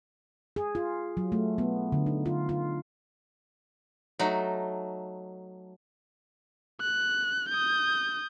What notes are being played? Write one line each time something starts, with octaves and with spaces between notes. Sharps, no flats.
G#4
F4
F#3
A3
B3
D3
D#4
F4
F4
F#3 A3 D#4
F#6
D#6 G6